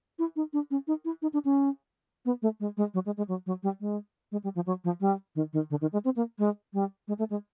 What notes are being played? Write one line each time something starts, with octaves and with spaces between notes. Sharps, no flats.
E4
D#4
D4
C#4
D#4
E4
D#4
D4
C#4
B3
A3
G#3
G#3
F#3
G#3
G#3
F#3
F#3
G3
G#3
G#3
G3
F3
F#3
F3
G3
D#3
D#3
D3
D#3
G#3
C4
A#3
G#3
G3
G#3
A3
G#3